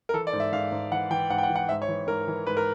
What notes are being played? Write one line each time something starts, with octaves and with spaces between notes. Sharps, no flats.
A#4
E3 A4
D5
G#2
E5
G#2 F5
G#2
E3 F#5
E3 G5
G#2 F#5
G5
F#5
E3
F#5
G#2 E5
C#5
E3
G#2 A#4
E3
G#2 B4
A#4